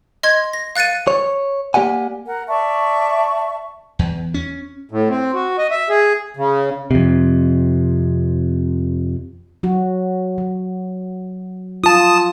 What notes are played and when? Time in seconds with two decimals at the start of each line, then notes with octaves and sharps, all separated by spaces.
0.23 D#5 C6 G#6
0.53 A#6
0.76 F5 F#6 A6 C#7 D#7
1.07 C#5
1.74 A#3 G4 D5 F#5 G#5
2.27 A#4 F#5
2.48 D5 E5 A5 C#6
3.99 E2
4.34 C#4
4.91 A2
5.09 C4
5.34 F#4
5.58 D#5
5.71 E5
5.89 G#4
6.37 C#3
6.91 F2 C3
9.63 F#3 F#4
10.38 F#3
11.84 F4 A5 D#6